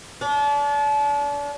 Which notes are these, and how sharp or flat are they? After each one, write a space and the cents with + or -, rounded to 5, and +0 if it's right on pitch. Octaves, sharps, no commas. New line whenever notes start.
D4 -35